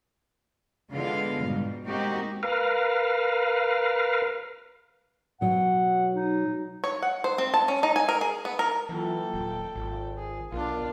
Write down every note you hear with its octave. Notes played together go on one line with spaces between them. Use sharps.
D3 G#3 B3 F4 F5
G#2 B2 G3
G#3 A#3 C4 D#4 F#4 G4
A#4 B4 F5
B2 F#3 F#5
D#4
C#5
F#5
C5
C4
A5
C#4
D#4
G#5
A#4
G#4
B3
A#4
E3 F#3 A#3 F4 A4 G5
D#1
G#1 F4
G#4
B1 B3 D4 F4 A#4